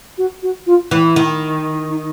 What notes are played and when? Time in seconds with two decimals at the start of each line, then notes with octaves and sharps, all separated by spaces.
0.18 F#4
0.43 F#4
0.67 F4
0.91 E3 E4
1.16 D#3
1.89 D#4